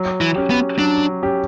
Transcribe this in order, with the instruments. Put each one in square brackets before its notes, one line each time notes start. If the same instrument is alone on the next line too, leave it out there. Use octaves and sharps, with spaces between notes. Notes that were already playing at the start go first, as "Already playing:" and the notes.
Already playing: [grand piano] F#3
[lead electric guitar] E3
[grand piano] C#4 G4
[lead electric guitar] B3
[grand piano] F#3 [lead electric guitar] D4
[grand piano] C#4 G4